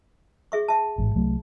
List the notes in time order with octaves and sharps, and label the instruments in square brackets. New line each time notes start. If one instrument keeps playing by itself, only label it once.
[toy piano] G#4 E5 C#6
E5 A5
[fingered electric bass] A1 G#2
C2 F#3 A3